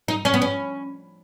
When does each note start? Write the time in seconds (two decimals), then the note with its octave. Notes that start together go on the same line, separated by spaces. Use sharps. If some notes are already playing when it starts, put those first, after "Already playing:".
0.08 D#4
0.25 C#4
0.34 B3
0.42 C#4